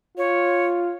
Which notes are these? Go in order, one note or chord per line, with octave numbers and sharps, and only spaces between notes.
F4 C#5